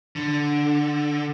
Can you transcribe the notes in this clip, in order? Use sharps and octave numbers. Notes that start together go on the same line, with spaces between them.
D3